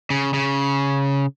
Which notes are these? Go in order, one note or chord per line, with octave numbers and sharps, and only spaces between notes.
C#3
C#3